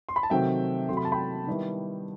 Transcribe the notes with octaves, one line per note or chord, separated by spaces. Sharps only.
C6
B5
A5
C3 D#3 F#3 A3 C4 E5 G5
C3 F#3 A3 C6
B5
A5
G5 B5
D#3 G3 B3 E4